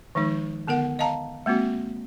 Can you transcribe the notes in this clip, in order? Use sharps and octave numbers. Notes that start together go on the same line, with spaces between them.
D#3 F3 G#3 D#4
D3 B3 A#4 F#5
D#5 F5 A5 A#5
G#3 A#3 C4 F#4